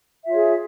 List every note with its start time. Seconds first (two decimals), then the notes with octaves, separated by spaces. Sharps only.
0.23 E5
0.27 F4
0.31 C#5
0.35 G#4